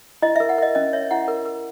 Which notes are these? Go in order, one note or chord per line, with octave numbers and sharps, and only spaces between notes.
E4 D#5
E5
A#4
F#5
A#4 D#5
C#4 D#5
C#5 E5
E4 F#5
A#4
A#4